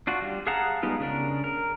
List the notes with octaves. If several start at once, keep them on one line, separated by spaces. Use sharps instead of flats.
D4 F4 F#4
G3
G#4 F5 F#5 A5 A#5
G3 G#3 B3 D#4 F4
C#3 D4 A#4
A#4